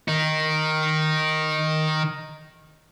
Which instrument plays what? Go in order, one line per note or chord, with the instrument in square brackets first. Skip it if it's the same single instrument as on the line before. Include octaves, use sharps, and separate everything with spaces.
[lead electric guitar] D#3 D#4